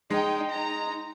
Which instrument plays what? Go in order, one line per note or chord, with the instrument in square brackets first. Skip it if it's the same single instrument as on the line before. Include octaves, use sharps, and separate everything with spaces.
[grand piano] G#3 [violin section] D#4 G5
[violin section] D#4 A#5